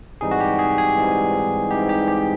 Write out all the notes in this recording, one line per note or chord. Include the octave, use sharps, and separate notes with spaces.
G#2 E3 G3 C4 D#4 G#4
F#4
G4
G#4
G#4
G#2 E3 G3 C4 D#4
G#2 E3 G3 C4 D#4 G4
G4
G4